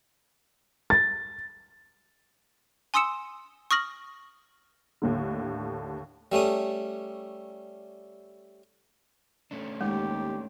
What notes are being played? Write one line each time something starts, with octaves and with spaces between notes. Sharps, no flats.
A6
G#5 C6 D#6 E6 C#7 E7
C#6 D#6 F6 A#6 F#7
D#2 A2 D3
G3 A3 C#4 D#6
A3 C#4 D4
D#2 G#3 G4